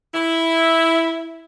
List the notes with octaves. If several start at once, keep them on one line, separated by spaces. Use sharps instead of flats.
E4